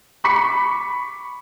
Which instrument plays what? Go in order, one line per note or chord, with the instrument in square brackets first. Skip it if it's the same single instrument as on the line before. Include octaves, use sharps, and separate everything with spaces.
[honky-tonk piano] B5 C#6 D6 B6 C#7